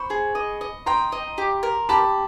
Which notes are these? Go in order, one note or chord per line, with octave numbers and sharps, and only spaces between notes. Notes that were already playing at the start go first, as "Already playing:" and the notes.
Already playing: C5 B5 C#6
G#4
D#5
D#5
G5 A#5 C6
D#5
G4
A#4
G4 A5 B5